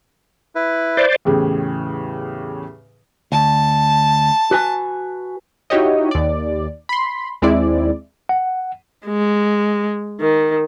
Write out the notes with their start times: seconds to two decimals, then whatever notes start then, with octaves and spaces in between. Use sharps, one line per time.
0.55 E4 B4
0.97 C5 D5
1.25 E2 A2 C#3 G4 G#4
3.32 D2 A5
4.51 F#4 B4 G#5
5.70 D#4 E4 F#4 G4 C#5 D#5
6.11 D#2 D5
6.89 B5 C6
7.42 D#2 G#3 C4 E4 D5
8.29 F#5
9.06 G#3
10.20 D#3